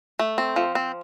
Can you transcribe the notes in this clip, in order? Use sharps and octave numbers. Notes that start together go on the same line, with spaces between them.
A3
C4
F3
C4